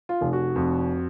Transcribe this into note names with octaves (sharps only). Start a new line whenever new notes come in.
F4
F1
F#4
F2